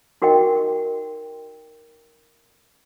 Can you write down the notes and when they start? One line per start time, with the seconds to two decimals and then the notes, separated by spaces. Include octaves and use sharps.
0.22 D#4 F#4 A#4 D#5 G5